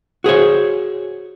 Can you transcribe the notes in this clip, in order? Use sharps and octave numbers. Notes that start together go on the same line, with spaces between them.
F#4 G#4 C5 C#5